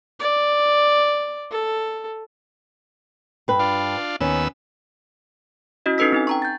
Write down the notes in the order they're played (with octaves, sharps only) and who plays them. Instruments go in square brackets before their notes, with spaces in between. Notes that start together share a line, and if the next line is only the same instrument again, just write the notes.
[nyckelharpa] D5
A4
[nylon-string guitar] G2 B4
[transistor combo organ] D4 F4
[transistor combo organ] D#2 B3 E6 [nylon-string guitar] C#4
[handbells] C#4 E4 F#4 D#5
C#4 D#4 A4 B4 E6 B6
C4 D#4 G#5
G5 A#5 C#6
G6 A6